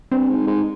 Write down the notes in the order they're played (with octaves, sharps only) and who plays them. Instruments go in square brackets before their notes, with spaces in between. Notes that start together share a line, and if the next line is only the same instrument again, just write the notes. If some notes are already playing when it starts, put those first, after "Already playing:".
[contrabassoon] G2 [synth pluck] C4 C5
[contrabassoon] G#2
G#2